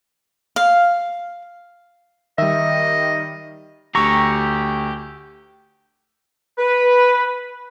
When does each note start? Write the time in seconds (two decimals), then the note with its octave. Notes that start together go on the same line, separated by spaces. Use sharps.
0.56 F5
2.38 D#3 G3 D#5 E5
3.95 D2 G4 A#5 C#6 E6
6.58 B4